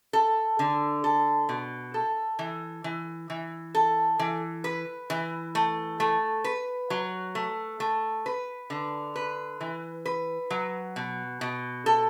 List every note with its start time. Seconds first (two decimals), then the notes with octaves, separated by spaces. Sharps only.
0.13 A4
0.59 D3
1.04 A4
1.49 B2
1.94 A4
2.39 E3
2.84 E3
3.30 E3
3.75 A4
4.19 E3
4.64 B4
5.10 E3
5.55 A3
6.00 A3
6.44 B4
6.90 F#3
7.35 A3
7.80 A3
8.26 B4
8.70 D3
9.16 B4
9.61 E3
10.05 B4
10.50 F#3
10.96 B2
11.41 B2
11.86 A4